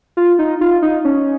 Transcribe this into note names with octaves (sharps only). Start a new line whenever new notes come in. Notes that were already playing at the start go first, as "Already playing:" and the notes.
F4
D#4
F4
D#4
C#4